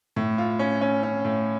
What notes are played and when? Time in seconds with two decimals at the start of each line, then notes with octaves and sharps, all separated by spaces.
0.16 A2
0.38 F4
0.59 C#4
0.81 C#4
1.03 C#4
1.25 A2